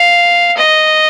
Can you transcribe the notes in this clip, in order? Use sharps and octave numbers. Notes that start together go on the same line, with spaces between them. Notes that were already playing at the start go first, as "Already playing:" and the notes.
Already playing: F5
D#5